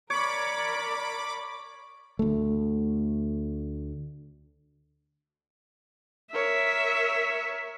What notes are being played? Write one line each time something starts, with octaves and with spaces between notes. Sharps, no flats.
A#4 C#5 D5 B5 D6
D2 A3
A#4 C#5 E5